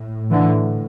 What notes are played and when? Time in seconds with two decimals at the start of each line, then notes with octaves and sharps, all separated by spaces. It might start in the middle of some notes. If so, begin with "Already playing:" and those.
Already playing: A2
0.31 D3 E3